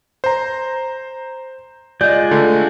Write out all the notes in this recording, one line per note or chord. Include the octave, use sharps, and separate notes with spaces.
C5 A#5
G#3 F4 D5 D#5 G6
D3 A3